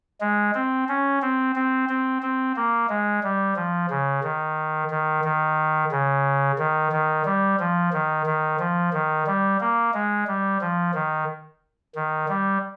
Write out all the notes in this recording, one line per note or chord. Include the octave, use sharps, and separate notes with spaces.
G#3
C4
C#4
C4
C4
C4
C4
A#3
G#3
G3
F3
C#3
D#3
D#3
D#3
C#3
D#3
D#3
G3
F3
D#3
D#3
F3
D#3
G3
A#3
G#3
G3
F3
D#3
D#3
G3